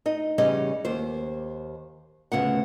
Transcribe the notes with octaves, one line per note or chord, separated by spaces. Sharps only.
D#4 D#5
E2 C#3 G3 C#4 G#4 D#5
D#2 C5
D2 C#3 B3 F#5